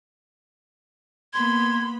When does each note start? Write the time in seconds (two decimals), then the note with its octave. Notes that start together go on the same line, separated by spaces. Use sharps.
1.34 A#3 B3 B5 C6 G#6